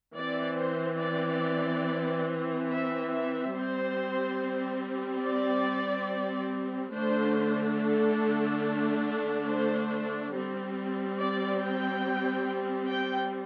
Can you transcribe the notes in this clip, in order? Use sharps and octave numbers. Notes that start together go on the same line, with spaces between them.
E3 C4 D5
C5
D5
E5
E5
G3 C4 C5
D5
D3 A3 D4 C5
A4
C5
G3 C4
D5
G5
G5